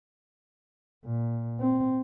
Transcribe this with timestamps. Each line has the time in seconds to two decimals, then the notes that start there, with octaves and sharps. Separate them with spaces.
1.05 A#2
1.60 C4